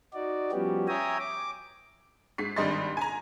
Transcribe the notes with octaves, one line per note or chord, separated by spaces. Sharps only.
D#4 F#4 D5
F3 G3 B3 C#4 F#4 G4
C#5 E5 G5 G#5 A#5 D#6
D6
G#2 B6 C7
G#1 G2 G3 D#5 C6 A6
G#5 A#5